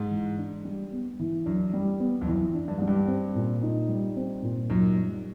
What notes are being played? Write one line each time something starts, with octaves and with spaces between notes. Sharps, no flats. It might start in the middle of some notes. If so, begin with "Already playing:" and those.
Already playing: G#2
E3
D4
G3
B3
E3
F#2 D4
G3
B3
F2
F#2 E3
D4
G2
G#2 G3
G2
C4
A#2
D#4
G3
C4
A#2
F#2 D#4
G3